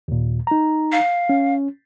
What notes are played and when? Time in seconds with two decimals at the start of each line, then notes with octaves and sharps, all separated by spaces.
0.08 D#2 A#2
0.47 D#4 A#5
0.92 F5
1.29 C#4